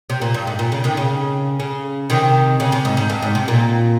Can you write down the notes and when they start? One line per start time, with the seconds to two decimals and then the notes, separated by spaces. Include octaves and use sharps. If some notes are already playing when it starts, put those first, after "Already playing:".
0.10 C3
0.21 A#2
0.34 G2
0.47 G#2
0.59 A#2
0.72 C#3
0.84 C3 D#3
0.97 C#3
1.60 C#3
2.10 C3 D#3
2.60 C#3
2.72 C3
2.85 G#2
2.97 G#2
3.10 G2
3.22 G#2
3.35 C3
3.48 A#2